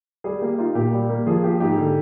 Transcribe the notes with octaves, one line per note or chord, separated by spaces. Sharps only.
G3 G#4
A#3 G4
D#4 F4
A#2 G4
G3
A#3
F3 G#4
A#3 G4
G#2 G4
D3